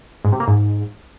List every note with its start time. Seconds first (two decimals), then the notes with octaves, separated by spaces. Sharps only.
0.25 G#2
0.32 C3
0.40 A#3
0.48 G#2